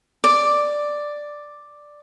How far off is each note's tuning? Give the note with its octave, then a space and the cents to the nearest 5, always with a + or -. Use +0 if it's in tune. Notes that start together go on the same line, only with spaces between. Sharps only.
D5 +5 D6 +0